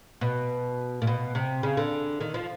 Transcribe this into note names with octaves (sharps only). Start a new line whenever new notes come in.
B2
A#2
B2
C3
C#3
D3
D#3
F3